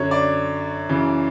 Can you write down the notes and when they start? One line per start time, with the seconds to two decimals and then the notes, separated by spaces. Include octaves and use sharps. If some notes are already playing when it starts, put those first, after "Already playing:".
Already playing: F#2 D3 C#5
0.11 D5
0.89 F#2 C#3 E3